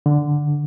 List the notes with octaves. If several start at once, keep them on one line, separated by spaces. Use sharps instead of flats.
D3